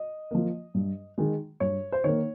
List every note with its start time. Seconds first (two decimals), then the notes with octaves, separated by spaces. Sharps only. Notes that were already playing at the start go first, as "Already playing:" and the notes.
Already playing: D#5
0.31 F3 A#3
0.74 G2
1.18 D#3 G#3
1.60 G2 C#5
1.92 C5
2.04 D#3 A#3 C#5